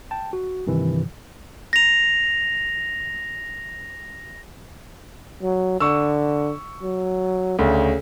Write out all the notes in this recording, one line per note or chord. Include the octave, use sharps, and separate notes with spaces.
G5 A5
F#4
G2 C3 D#3 E3
A#6 F7
F#3
D3 C#6 E6
F#3
D2 C#3